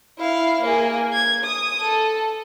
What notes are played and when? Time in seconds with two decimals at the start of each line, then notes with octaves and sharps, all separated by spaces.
0.18 E4 F5
0.62 A#3 G#4
1.13 G#6
1.44 D#6
1.80 A4